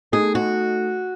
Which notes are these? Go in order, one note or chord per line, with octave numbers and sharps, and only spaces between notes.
A3 D#4 G#4 A4
F#4